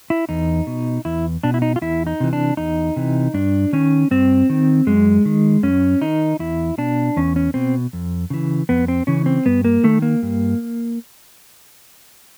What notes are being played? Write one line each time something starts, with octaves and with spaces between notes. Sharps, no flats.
E4
E2 D#4
B2
E2 E4
B2 D4
E4
D#4
F4
E2 E4
D#4
C3 E3
D4
E2 D#4
C3 E3
G2 D4
D#3 C#4
G2 C4
D#3
F#2 G#3
D#3
F#2 C#4
D#3 D#4
E2 E4
B2 D4
E2 C#4
C#4
B2 C4
F2
C#3 E3
F2 B3
C4
C#3 E3 C#4
C4
G2 B3
A#3
D#3 A3
A#3
G2